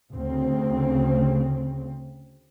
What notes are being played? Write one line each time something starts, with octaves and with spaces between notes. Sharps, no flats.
D2 C#3 C4